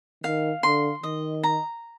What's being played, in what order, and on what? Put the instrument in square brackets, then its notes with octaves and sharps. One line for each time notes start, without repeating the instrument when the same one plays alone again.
[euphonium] D#3 [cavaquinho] F5
[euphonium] D3 [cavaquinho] C6
[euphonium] D#3 [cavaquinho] D#5
[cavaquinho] A#5